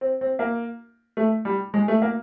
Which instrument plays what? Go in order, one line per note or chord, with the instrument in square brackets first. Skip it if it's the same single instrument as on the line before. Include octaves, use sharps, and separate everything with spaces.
[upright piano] C4
C4
A#3
A3
G3
G#3
A3
A#3